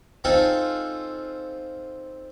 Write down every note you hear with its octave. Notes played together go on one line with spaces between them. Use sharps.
C4 D#4 F4 A4 G#5